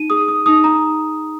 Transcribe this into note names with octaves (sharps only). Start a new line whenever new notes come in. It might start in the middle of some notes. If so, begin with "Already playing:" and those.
Already playing: D#4 D#7
G#4 D#6
D#6
D#4 D#6
A#5